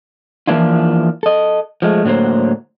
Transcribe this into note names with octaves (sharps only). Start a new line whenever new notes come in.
E3 F3 A#3 D4 E4 F4
A4 D#5
F3 G#3 A3
A2 D3 F#3 A#3 C5